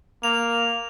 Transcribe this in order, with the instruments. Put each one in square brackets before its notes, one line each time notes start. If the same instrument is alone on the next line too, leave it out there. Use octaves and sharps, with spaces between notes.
[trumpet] A#3 [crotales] F7